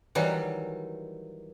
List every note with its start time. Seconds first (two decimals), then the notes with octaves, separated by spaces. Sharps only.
0.15 D#3 E3 F#3 G3